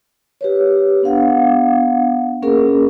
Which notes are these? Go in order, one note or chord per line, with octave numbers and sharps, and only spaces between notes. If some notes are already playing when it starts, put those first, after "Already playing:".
G4 B4 C#5
B3 D4 F5 F#5
A#3 C#4 G#4 A#4